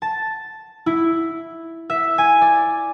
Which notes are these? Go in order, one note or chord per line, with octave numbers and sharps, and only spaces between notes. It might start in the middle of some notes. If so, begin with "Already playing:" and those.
A5
E4
E5
G#5
D5